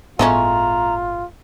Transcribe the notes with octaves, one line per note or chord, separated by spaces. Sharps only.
G1 A2 G#3 A3 B3 C#4 F4 A#5